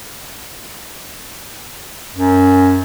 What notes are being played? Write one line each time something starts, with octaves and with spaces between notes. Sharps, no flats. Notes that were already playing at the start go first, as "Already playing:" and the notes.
F#2